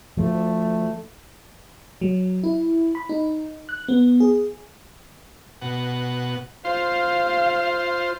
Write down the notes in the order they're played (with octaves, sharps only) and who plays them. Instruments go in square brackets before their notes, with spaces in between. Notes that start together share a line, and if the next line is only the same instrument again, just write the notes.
[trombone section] D2 A3 [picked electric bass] F3
[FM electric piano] F#3
E4
B5
D#4
F#6
B3
G#4
[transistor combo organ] B2 F#5
[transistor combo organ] F4 C5 [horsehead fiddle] F5